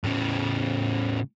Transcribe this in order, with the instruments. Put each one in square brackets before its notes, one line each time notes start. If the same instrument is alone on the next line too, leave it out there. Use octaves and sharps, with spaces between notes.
[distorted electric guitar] A2 C#3